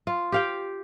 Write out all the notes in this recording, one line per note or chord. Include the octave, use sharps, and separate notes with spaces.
F4
G4 F5 G5